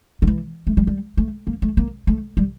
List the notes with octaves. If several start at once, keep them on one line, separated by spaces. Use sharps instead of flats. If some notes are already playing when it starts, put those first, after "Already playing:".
D3
E3
A3
G3
G3
A3
A#3
A3
A#3
A3
G3